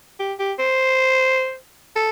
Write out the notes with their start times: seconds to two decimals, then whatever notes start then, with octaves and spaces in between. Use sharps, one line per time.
0.20 G4
0.39 G4
0.59 C5
1.96 A4